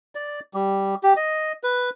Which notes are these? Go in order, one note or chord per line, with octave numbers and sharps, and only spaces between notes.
D5
G3
G4
D#5
B4